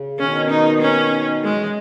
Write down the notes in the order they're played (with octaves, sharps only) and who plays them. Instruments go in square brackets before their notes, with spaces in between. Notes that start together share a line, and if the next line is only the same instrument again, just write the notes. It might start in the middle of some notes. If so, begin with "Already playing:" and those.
Already playing: [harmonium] C#3
[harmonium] B2 D#3 [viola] C#4
[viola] D#4
C#4
G#3
[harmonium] F#3
E3